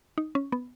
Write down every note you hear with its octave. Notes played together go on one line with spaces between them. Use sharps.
D#4
C#4
B3